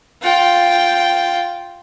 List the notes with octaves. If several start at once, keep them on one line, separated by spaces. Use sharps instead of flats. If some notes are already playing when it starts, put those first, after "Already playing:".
F4 G5